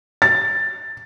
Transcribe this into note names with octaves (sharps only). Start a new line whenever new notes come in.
A6